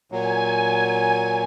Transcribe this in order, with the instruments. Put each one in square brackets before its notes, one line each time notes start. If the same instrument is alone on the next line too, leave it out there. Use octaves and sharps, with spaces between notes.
[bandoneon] A#2 F#3 [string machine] G#5